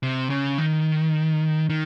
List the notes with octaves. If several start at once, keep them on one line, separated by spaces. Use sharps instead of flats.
C3
C#3
D#3
D#3